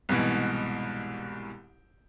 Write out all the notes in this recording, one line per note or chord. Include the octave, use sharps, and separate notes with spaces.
C2 G#2 B2 E3